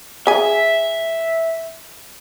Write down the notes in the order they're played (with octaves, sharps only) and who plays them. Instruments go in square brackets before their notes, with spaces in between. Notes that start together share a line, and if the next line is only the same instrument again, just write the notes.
[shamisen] G#4 G#5 [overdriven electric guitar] E5